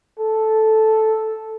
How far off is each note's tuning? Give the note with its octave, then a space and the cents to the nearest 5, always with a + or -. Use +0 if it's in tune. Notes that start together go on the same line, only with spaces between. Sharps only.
A4 -5